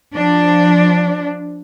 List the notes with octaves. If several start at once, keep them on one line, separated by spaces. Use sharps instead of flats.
F3 D4